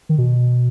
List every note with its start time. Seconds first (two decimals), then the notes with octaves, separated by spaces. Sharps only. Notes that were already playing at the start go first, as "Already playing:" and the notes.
0.09 D#3
0.18 B2